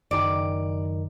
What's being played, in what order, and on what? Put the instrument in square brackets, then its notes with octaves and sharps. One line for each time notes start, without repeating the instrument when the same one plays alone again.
[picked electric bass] F#1 D#3 [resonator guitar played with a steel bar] D5